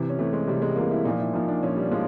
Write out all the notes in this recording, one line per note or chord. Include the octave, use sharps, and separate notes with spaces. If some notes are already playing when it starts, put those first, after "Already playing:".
Already playing: C3 E3
C#4
C3 E3 A3
G#3
C3 E3 G3
G#3
C3 E3 A#3
E4
A#2 F3 D#4
E4
A#2 F3 D#4
D4
A#2 F3 C#4
G3
F3 G#3